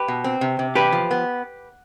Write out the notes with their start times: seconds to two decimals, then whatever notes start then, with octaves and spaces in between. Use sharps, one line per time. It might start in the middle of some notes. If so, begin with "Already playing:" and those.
Already playing: G4 B4
0.08 B2
0.24 C4
0.41 C3
0.59 C3
0.75 E2 G4 B4
0.92 F3
1.11 B3